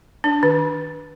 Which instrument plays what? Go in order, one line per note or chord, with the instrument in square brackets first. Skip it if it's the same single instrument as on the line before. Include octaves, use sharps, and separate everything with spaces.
[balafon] D4
D#3